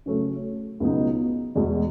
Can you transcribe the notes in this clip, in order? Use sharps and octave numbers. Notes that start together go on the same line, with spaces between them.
C#3 F#3 A3 C#4
C#2 B2 F#3 B3 D#4
E2 B2 G#3